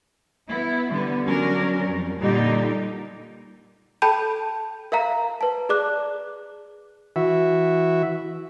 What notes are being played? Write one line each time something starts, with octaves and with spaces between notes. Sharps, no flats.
B3 E4
D3 G3 B3
D3 F#3 C#4 D4 A#4
F2 G3
A#2 D3 G3 D#4 G4
A4 G5 A5 B5 G6 D#7
A#4 E5 F5 A#5
B4 A5
G#4 D5 D6 F#6
E3 F#4 E5